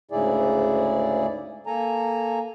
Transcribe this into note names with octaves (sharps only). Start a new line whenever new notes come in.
D2 G#2 C#3 E4 G#4 D5
A#3 A4 G#5 A#5